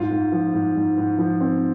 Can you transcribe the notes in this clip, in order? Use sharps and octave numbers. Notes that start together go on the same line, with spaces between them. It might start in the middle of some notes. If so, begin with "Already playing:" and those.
Already playing: G#2 F4
G#2
F3
G#2
G#2
G#2
F3
C4